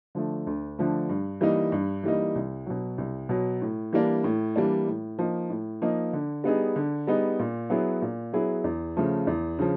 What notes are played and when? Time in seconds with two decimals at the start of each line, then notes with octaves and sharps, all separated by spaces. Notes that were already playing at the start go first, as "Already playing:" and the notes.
0.15 D3 F3 A3
0.47 D2
0.79 D3 F3 A3
1.10 G2
1.41 E3 G3 A#3 D#4
1.72 G2
2.04 E3 G3 A#3 D#4
2.36 C2
2.66 B2 F#3
2.98 C2
3.29 B2 F#3
3.62 A2
3.93 E3 G3 A#3 D4
4.24 A2
4.56 E3 G3 A#3 D4
4.87 A2
5.19 F3 A#3 D#4
5.50 A2
5.82 F3 A#3 D#4
6.13 D3
6.44 G3 B3 D#4 G#4
6.76 D3
7.07 G3 B3 D#4 G#4
7.39 A#2
7.70 F#3 B3 E4 G#4
8.02 A#2
8.33 F#3 B3 E4 G#4
8.64 E2
8.97 C#3 F3 A3
9.27 E2
9.59 C#3 F3